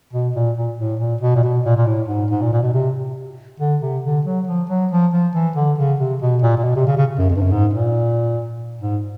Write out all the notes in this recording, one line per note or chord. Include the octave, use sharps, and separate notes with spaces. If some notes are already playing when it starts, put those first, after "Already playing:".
B2
A#2
A#2
A2
A#2
B2
A#2
B2
A#2
A#2
A2
G#2
G#2
A#2
A#2
B2
C3
D3
C3
D3
F#3
F3
F#3
F3
F3
E3
D3
C#3
C3
B2
A#2
A#2
B2
C3
C#3
C#3
F#2
F2
G2
F#2
G#2
A#2
G#2